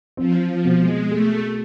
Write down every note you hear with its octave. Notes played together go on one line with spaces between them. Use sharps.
F3 C4
F3
B2
G#3
A3 G#4